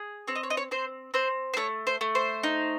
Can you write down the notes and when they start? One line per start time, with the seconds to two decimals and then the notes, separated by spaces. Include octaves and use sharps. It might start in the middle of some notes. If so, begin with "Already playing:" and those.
Already playing: G#4
0.28 C4 C#5
0.35 D#5
0.43 C#5
0.50 D#5
0.57 C#5
0.71 C4 C5
1.14 C4 C5
1.54 C5
1.57 A3 C#5
1.87 C5
2.01 A3
2.15 C5
2.43 D#4